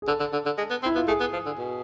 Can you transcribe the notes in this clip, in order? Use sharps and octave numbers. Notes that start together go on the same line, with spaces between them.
G#4
D3 A4
D3
D3
D3
G#3
B3
C4
E4
B3 F4
A3 G#4
B3
F3
D3
B2